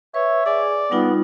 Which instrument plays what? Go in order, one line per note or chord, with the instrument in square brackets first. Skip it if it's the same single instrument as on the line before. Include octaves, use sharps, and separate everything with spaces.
[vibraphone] B4 [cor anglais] C#5 [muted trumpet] E5
[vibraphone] G#4 G#5 [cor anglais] D5
[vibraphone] G3 D#4 F4 [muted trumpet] B3